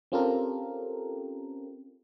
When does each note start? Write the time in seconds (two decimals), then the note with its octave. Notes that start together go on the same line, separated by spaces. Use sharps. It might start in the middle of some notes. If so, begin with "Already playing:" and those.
0.12 C4 C#4 F4 G4 A4 A#4